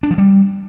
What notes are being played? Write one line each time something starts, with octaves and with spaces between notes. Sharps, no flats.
D4
F3
G3